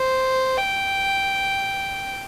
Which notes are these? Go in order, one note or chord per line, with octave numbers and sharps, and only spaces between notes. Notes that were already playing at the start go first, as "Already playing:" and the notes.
Already playing: C5
G5